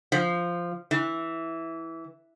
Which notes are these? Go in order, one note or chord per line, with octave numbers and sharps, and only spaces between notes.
F3
E3